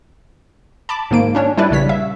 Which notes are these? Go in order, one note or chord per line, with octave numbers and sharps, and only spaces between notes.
A5 B5 D6
G#2 D#3 A#3 D7
C#4 D4 C#5
G3 D4 E4 B4 D5
A#1 C#3 G3 C#5 B6
E5